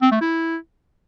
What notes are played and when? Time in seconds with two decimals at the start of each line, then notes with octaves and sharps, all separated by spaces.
0.02 C4
0.11 A3
0.21 E4